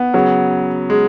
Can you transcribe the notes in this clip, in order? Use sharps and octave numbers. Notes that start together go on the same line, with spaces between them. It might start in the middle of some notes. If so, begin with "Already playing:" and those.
Already playing: B3
C#3 F#3
G#3